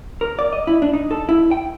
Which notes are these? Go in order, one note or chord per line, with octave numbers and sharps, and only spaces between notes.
A#4
D5
D#5
E4
D4
D#4
A4
E4
G5